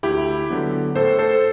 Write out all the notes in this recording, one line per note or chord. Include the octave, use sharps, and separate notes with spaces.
D2 E4 G4
D3 F#3 B3
A2 A4 C5
A4 C5